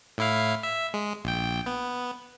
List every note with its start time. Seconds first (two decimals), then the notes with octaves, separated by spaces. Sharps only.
0.18 A2 E4 F5
0.63 E5
0.94 G#3
1.24 A#1 G5
1.66 B3